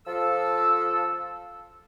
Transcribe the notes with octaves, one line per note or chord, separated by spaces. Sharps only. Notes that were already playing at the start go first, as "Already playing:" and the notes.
F3 A4 E6